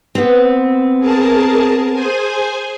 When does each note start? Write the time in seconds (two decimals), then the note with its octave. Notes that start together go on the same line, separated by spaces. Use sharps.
0.15 B3 C4
1.00 G#4 A#4 A5
1.93 G#4 C5 G#5